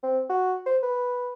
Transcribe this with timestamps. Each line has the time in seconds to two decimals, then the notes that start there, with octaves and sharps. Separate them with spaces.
0.03 C4
0.30 F#4
0.66 C5
0.83 B4